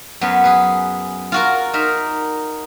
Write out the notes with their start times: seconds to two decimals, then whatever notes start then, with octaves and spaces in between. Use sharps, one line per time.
0.21 F#2 F#3 B3
0.44 G#4 B4
1.32 F4 F#4 A#4
1.74 D#4 A#4 E5